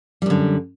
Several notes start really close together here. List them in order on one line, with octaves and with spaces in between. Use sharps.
G3 F#2 D3